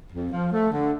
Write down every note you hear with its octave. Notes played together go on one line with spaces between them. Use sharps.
F2
F3
A3
D3